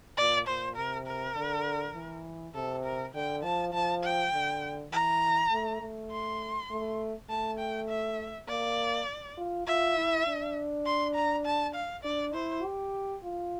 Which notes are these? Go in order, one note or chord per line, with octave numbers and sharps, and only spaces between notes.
A#2 D5
A#2 C5
C3 A#4
A#4
D3
E3
C3 A4
A#4
D3 G5
F3 A5
F3 A5
G5
D3
E3 A#5
A3
A3
C6
A3
A3 A5
G5
E5
A#3 D5
F4
F4 E5
E4
D4
C6
A#5
A5
F5
D4 D5
E4 C5
G4
F4